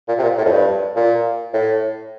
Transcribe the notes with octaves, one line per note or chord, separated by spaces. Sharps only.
A#2
C3
A#2
A2
F2
G2
A#2
A2